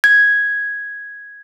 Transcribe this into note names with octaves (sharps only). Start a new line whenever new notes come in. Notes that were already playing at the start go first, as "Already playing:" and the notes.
G#6